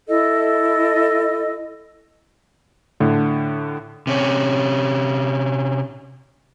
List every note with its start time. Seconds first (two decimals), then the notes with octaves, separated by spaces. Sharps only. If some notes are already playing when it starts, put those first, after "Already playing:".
0.08 E4 A4 D#5
3.00 A2 D3
4.07 C3 C#4